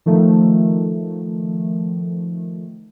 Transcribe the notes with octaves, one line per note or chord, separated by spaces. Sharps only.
D#3 F3 A3